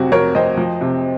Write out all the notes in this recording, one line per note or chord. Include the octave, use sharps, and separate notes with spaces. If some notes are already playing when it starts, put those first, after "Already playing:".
Already playing: F2 C3 F#3 F#4
F2 A#4 C#5
F2 C5 D#5
F3
C3